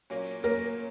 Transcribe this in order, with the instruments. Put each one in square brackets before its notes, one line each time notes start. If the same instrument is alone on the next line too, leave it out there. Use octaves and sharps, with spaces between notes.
[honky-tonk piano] A#2 F#3 A#3 C#4
[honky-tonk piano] A#2 F#3 A#3 C#4 [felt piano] A#4